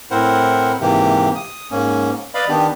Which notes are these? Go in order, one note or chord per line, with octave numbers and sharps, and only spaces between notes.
A2 C4 E4 A#4 C5 F#5
G#2 C3 E3 A#3 G4
D#6
G#2 A#3 C#4
B4 D5 D#5 F5 B5
D#3 B3 D4 G4